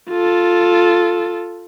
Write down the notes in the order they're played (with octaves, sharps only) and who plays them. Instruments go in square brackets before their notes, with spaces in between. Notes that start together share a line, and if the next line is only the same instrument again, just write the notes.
[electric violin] F4 A4